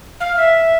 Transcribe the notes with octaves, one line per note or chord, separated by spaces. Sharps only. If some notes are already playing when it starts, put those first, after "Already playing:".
F5
E5